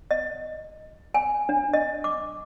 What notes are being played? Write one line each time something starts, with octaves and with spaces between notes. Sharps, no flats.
D#5
G#5
D4
D#5
D6